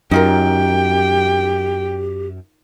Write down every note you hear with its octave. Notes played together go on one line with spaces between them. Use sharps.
F#2 D#4 F4 G4 A#4 G5